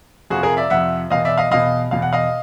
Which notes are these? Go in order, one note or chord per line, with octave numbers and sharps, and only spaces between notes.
F2 C3 F3 F#4 G#4
G#4 A#4
D5 E5
F2 C3 F3 E5 F#5
E2 B2 D#5 F5
D5 E5
D#5 F5
E2 B2 D#5 F5
E2 B2 F5
F#5
D#5 F5